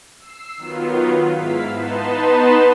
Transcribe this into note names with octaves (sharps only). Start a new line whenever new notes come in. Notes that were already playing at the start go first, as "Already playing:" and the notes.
E6 C7
D#3 F#3 B3 F4
G#2 E4 F5 B6
B3 D#4 B4 A5 C6 E7